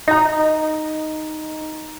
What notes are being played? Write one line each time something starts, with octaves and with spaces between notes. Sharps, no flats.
D#4 D#5 A#5